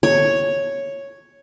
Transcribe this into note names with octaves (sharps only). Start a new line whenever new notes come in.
C#5